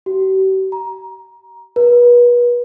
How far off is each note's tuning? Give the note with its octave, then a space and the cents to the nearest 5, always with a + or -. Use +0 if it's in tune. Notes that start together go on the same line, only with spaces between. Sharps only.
G4 -45
A#5 +20
B4 -35